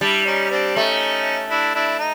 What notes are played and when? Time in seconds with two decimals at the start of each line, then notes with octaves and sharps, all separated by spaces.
0.01 G3 D4 E4
0.26 C#4 D#4
0.51 C4 D4
0.75 A3 C#4 D#4
1.50 D4 E4
1.75 D4 E4
1.99 D#4